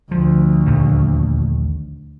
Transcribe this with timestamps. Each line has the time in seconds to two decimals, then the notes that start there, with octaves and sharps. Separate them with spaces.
0.11 D2 F3
0.66 A#1 D#2 A3